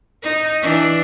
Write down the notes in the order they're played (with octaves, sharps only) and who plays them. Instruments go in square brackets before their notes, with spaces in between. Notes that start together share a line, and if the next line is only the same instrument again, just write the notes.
[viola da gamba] D#4
E3 D4